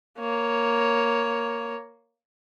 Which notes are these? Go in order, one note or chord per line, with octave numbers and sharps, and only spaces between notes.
A#3 C#5